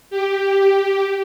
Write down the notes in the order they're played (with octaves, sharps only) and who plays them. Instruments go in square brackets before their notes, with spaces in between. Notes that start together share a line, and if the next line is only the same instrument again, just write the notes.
[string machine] G4